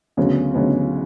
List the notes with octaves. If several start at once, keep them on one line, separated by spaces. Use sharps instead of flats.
D2 C#3 F#3 B3
D2 C#3 F#3 B3